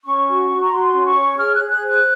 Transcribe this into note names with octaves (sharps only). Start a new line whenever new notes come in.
C#4 C#6
F#4
F#4
A#5
F#4 C6
C#4
C#6
C#5
G#4 F6
G#4 F#6
F#6
C5
F#6